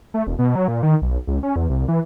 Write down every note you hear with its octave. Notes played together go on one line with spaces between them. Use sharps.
A3
E1
B2
F#3
A#2
D#3
B1
C#2
C#4
E2
C2
E3